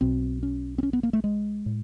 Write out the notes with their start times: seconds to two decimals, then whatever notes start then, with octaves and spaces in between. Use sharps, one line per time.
0.01 B1 B2 C4
0.43 C#4
0.78 C4
0.83 C#4
0.93 B3
1.03 A#3
1.13 A3
1.24 G#3
1.66 A2